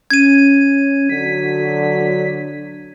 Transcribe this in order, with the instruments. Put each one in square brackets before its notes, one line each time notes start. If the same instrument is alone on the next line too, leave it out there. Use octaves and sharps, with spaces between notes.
[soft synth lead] C#4 [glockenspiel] G#6 D#7
[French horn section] D3 F#3 [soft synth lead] B6